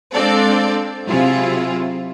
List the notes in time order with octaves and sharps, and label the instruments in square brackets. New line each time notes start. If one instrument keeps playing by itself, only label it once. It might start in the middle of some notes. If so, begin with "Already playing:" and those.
[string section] G#3 C4 D4 A4 D5 F5
C3 F#3 E4 F4 G#4